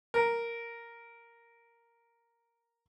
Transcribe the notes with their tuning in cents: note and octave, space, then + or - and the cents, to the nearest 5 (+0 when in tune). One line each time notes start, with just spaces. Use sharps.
A#4 +0